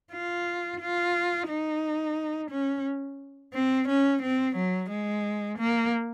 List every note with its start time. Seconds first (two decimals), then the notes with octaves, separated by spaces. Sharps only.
0.13 F4
0.80 F4
1.49 D#4
2.51 C#4
3.54 C4
3.88 C#4
4.22 C4
4.56 F#3
4.90 G#3
5.58 A#3